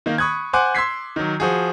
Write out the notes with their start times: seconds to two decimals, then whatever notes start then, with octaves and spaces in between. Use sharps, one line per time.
0.06 D#3 A#3
0.18 B5 C#6 D#6 F#6 G#6
0.53 C5 F#5 G#5 C6 D6 F#6
0.75 C6 E6 G#6 B6 C7
1.16 D#3 F#3
1.40 F3 F#4 G#4